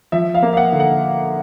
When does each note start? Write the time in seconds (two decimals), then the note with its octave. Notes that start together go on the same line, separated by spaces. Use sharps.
0.12 F3 E5
0.34 F5
0.43 A#3
0.53 F5
0.57 F#5
0.72 D3
0.80 F#5